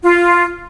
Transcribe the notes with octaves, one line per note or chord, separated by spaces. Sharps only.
F4